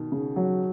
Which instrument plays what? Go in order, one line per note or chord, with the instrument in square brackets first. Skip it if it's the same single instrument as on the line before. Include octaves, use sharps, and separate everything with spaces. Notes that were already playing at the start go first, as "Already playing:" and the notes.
Already playing: [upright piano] B2 D#3
[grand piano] C#3
F#3